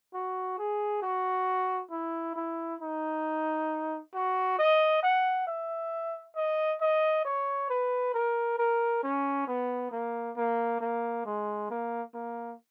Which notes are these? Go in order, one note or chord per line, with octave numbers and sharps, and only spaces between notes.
F#4
G#4
F#4
E4
E4
D#4
F#4
D#5
F#5
E5
D#5
D#5
C#5
B4
A#4
A#4
C#4
B3
A#3
A#3
A#3
G#3
A#3
A#3